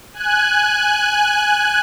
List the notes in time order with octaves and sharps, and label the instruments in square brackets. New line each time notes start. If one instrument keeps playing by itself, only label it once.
[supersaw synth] G#5 F#6